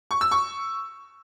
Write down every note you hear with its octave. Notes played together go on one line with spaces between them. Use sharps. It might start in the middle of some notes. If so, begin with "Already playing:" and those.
C#6
E6
C#6